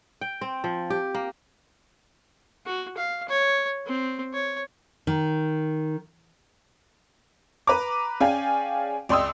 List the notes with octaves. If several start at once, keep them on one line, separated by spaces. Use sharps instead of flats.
G5
C4
F3
G4
A#3
F#4
F5
C#5
C4
C#5
D#3
B4 A#5 D6
C#4 G#4 D5 F5 G5 G#5
C#2 D5 G5 C6 D#6 E6